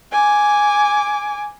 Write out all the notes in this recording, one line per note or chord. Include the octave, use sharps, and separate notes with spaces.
G#5 D6